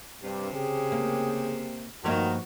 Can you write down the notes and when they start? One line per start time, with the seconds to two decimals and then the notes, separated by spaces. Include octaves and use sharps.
0.23 G2 C3
0.53 C#3 G4 G#4
0.92 A#3
2.04 G2 D#3 F3 A#3 B3 D#4 F#4